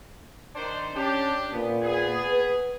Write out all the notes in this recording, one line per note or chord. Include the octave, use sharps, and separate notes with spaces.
D#3 D4 C5
C#4 D4 G4
A#2 B3
B3 G#4
B4